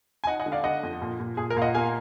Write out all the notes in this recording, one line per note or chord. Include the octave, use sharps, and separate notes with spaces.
G#5
D#4 D#5 F#5
D#5 F#5
D3
D5 F5
D3 D#5 F#5
F2
A#2
A#2
A#2 G#4
A#4
A#2 F5
D#5 F#5
A#3 F5 G#5